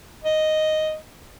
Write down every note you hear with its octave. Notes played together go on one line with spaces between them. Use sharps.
D#5